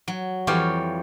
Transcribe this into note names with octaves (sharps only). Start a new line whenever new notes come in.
F#3
F2 E3 G3 G4 C#5 F5